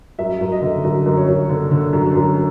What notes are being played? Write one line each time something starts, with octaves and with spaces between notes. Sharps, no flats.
F#2 E5
F#2
D#5
D3
F#2
F#2
C#5
F#2
D3
D3
F#2
F#2